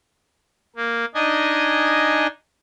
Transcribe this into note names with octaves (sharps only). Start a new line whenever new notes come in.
A#3
D4 D#4 D#5 G#5